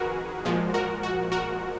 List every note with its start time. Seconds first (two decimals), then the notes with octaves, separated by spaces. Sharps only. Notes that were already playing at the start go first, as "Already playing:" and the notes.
Already playing: F2 D#3 F#4 G#4 A#4 B4
0.45 A#2 F3 G#3
0.74 F#4 A#4
1.03 F#4
1.32 F#4 A#4